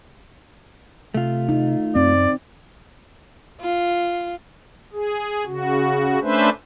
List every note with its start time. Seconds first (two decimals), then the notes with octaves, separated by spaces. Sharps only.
1.14 C3 A3 F4
1.49 D#4
1.96 F#2 C4 D5
3.61 F4
4.92 G#4
5.46 C#3 F#4
6.22 A3 C#4 D4 B4 C5 E5